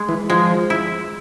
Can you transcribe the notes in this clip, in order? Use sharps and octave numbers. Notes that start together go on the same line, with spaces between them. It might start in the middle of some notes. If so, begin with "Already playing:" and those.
Already playing: G#3
E3
F3 G#3
E4